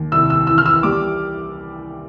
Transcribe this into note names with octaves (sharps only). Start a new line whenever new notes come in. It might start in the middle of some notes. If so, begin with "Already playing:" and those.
Already playing: D#2
C2 E6
E6
E3 E6
F6
E6
G3 D6